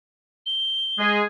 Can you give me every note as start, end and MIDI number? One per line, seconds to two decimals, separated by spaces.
0.46 1.14 103
0.98 1.21 56
0.98 1.21 68